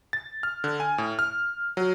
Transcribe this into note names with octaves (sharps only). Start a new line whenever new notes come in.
A6
F6
D3
G#5
A2
F6
F#3